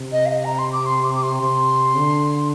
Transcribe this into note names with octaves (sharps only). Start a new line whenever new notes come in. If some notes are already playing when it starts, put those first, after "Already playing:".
Already playing: C3
D#5
F5
D#5
A#5
C6
D6
C6
D6
D6
C6
C3
D3